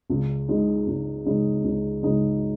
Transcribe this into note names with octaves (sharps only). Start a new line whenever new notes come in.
C#2
C#3 G#3 D#4
C#2
C#3 G#3 D#4
C#2
C#3 G#3 D#4